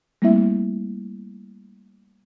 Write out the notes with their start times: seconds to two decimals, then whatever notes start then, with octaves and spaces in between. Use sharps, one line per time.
0.22 G3 A3 A#3 C4 E4 E5